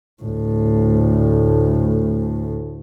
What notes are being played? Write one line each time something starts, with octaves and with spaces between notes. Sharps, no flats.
D2 A2